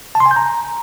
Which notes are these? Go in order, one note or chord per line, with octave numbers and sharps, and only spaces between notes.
A5
C6
G#5
G6
A#5